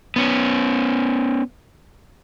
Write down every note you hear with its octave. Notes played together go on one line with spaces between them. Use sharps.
B3 C#4